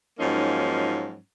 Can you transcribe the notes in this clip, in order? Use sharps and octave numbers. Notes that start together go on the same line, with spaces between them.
G#2 F3 F#3 A#3 C#4 D#4